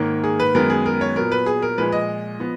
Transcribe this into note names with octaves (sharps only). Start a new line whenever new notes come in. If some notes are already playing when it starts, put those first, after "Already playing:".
Already playing: G#2 D#3 A#3 C#5
G#4
B4
F#2 D#3 G#3 B3 A#4
G#4
A#4
C#5
A#2 F#3 B3 A#4
B4
G#4
A#4
A#2 F3 G#3 B4
D#5
F3 B3